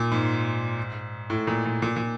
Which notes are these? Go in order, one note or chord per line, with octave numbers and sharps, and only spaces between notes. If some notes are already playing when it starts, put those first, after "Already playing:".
Already playing: A#2
G#2
A2
A#2
A#2
A#2
A#2